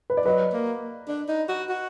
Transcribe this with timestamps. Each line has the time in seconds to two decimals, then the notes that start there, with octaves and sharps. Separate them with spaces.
0.10 B4
0.17 D5
0.25 F#3 B4 D#5
0.53 A#3
1.08 D4
1.28 D#4
1.49 F#4
1.69 F#4